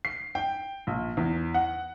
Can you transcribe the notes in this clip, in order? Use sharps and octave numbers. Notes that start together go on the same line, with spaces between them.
C7
G5
A#1
E2
F#5